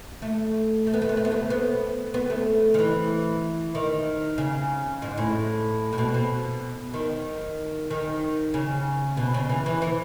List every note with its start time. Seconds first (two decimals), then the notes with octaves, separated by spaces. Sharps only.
0.22 A3
0.87 A3
0.94 B3
1.02 A3
1.09 B3
1.17 A3
1.25 B3
1.31 A3
1.50 B3
2.14 B3
2.30 A3
2.74 D#3
2.79 E3
3.75 D#3
4.38 C#3
5.02 G#2
5.18 A2
5.93 A2
5.98 B2
6.14 B2
6.94 D#3
7.90 D#3
8.54 C#3
9.17 B2
9.34 C#3
9.49 E3
9.66 E3
9.82 E3